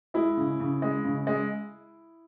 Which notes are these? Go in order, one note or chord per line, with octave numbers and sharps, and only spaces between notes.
G#3 E4
C#3
C#3
G#3
C#3
G#3